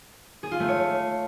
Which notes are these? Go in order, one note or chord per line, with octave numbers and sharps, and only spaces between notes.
G#4
F4
A3
C#5